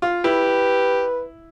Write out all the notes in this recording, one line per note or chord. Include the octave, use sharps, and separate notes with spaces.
F4
E4 G4 B4